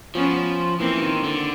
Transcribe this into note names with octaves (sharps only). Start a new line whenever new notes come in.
F3 B3 C#4
E3 A#3 C4
D#3
D3